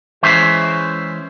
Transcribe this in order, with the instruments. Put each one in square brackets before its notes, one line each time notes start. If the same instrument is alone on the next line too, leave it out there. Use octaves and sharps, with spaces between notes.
[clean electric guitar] E3 G#3 C#4 C5 E5